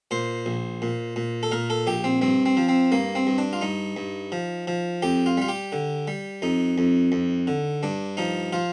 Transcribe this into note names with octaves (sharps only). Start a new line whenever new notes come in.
A#2 C5
A#1
A#2
A#2
A4
A#2 A#4
A4
A#1 G4
C4
G2 C4
C4
F3
C4
G2 A#3
C4
G2
D4
F4
G2 D#4
G2
F3
F3
F2 G4
F4
G3 F4
G4
D3
G3
F2 D#4
F2
F2
D3
G2 D4
F3 D#4
F3 F4